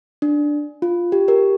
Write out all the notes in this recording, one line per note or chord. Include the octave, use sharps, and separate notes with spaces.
D4
F4
G4
G4 A#4